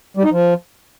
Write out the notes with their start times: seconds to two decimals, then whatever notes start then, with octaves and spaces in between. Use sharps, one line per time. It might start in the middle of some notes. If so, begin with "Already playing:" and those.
0.17 G3
0.24 D#4
0.31 F3